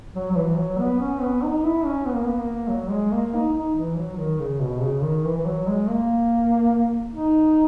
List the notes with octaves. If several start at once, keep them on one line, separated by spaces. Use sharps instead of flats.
F#3
F#3
E3
F#3
B3
C#4
B3
D#4
E4
C#4
B3
A#3
B3
A#3
F#3
G#3
A#3
D#4
D#4
E3
F#3
D#3
C#3
B2
C#3
D#3
E3
E3
F#3
G#3
A#3
D#4